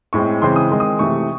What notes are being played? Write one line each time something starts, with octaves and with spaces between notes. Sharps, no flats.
A2 G#3 C4 C#6
C#3 E3 G#3 C4 C6
D#6
D#3 G#3 C4
D#6
C3 E3 A3 C4 C#6